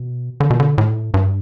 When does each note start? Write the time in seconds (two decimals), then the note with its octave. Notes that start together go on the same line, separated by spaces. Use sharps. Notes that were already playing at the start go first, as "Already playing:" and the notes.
Already playing: B2
0.40 D3
0.50 B2
0.60 D3
0.78 A2
1.14 G2